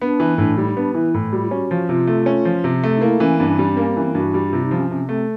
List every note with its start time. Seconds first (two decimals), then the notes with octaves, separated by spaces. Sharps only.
0.01 B3 D4
0.20 E3
0.38 A2 D4
0.58 G3 D#4
0.69 D#4
0.76 B3 D4
0.94 E3 E4
1.14 A2
1.33 G3 F#4
1.42 F4
1.51 C#4 F#4
1.71 F3
1.89 C3 F4
2.07 A3
2.26 C#4
2.45 F3
2.64 C3
2.83 A3
2.97 D#4
3.01 A#3 E4
3.20 E3 C#4
3.39 G2 C4
3.47 C#4
3.56 C4
3.59 G3
3.65 C#4
3.72 C4
3.77 A#3 C#4
3.89 C4
3.97 E3 C#4
4.05 C4
4.14 G2 F#4
4.34 G3
4.47 F#4
4.53 C3 F4
4.65 D#4
4.71 F3
4.77 C#4
4.90 C3 C#4
5.09 A3 C4